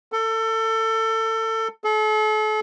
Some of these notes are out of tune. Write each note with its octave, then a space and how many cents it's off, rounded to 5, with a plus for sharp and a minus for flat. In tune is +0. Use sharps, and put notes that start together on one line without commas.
A4 +25
A4 -40